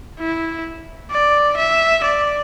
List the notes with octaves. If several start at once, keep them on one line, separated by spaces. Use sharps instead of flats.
E4
D5
E5
D5